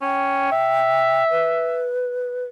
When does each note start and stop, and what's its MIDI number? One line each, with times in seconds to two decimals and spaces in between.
0.02 0.50 61
0.02 1.24 79
0.52 1.88 76
1.31 2.45 71